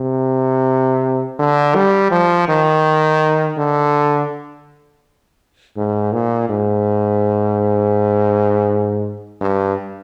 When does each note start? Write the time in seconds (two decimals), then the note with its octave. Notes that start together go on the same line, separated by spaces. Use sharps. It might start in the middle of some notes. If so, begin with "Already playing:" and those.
Already playing: C3
1.39 D3
1.75 G3
2.12 F3
2.48 D#3
3.58 D3
5.77 G#2
6.13 A#2
6.49 G#2
9.41 G2